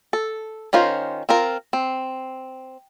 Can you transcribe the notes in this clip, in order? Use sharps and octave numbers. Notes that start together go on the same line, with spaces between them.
A4
D#3 C#4 F4 A#4 C5
C4 F4 A#4
C4